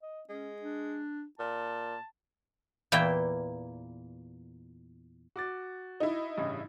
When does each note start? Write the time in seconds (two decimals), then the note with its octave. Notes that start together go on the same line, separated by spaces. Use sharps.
0.02 D#5
0.29 G#3 C#4
0.62 D4
1.39 A#2 A5
2.92 E2 A#2 A#3 E4 E5 G5
5.36 F#4 D6 A6
6.00 D#4 E4
6.37 A1 G2 C#3